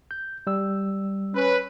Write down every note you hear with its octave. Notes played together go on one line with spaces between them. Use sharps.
G6
G3 E6
C#4 B4